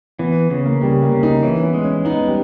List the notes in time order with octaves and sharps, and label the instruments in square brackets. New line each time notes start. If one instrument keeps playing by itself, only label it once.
[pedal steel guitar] E3 [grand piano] B3
[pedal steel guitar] C#3 [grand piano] B3
[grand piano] A#3
[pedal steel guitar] C#3 [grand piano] G3
[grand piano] A#3
[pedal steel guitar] C#3 [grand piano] C#4
[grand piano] D#4
[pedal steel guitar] E3 [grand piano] C#4
[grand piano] B3
[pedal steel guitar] G#3
[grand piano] C#4
[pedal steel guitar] B3 [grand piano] D#4
[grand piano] G3